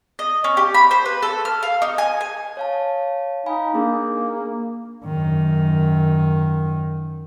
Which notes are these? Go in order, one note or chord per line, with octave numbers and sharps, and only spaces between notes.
D#5
C#4
G4
B5
C5
B4
A4
F6
F5
D#4
G#5
G#5
C#5 F5 A5
D#4 F5 G#5 B5
A#3 D4 G#4
F#2 D#3